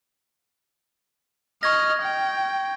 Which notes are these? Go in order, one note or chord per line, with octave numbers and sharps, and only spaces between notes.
D#5 C#6 F6 G#6 A#6
G5